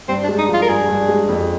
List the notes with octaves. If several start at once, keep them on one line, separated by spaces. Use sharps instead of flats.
G2 C4
D4
G#3
D#4
F3 F4
A#4
G2 G#4
G2
G#3
F2